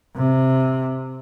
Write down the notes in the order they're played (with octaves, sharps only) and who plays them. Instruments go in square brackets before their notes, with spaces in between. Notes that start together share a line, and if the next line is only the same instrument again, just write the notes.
[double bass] C3